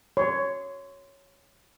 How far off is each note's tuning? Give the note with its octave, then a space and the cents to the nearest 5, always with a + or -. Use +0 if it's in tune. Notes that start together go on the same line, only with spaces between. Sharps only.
C#5 +0 C6 -25